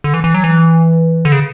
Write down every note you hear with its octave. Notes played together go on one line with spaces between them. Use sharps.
D3
E3
E3
F#3
E3
D3
C#3